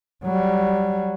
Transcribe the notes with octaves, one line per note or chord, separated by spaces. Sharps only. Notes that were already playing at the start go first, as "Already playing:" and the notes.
F#3 G3